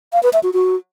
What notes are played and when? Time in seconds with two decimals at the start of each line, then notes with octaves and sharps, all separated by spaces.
0.13 F5
0.23 B4
0.33 E5
0.43 F#4
0.53 F#4